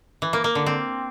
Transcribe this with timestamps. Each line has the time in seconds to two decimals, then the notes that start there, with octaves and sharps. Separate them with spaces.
0.22 E3
0.33 A#3
0.44 A#3
0.55 D3
0.66 C4